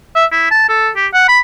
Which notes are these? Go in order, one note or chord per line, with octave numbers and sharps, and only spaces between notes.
E5
E4
A5
A4
G4
F#5
B5